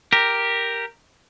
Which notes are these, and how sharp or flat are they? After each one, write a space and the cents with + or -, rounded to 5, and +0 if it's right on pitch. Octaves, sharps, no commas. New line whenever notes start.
G4 +0 A#4 +0